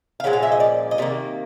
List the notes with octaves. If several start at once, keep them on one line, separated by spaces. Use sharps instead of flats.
F5
A#2 F3 G#3 C#4 F#5
F5
E5
D#5
D5
D#5
C3 D#3 A#3 D5